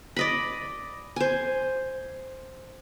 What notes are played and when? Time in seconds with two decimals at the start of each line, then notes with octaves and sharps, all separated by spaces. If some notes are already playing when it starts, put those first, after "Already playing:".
0.16 D5 D#5 B5
1.16 C5 G#5